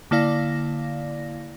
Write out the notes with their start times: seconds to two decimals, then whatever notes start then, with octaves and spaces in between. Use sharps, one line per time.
0.11 D3 A#3 E4 D5 F5 A#6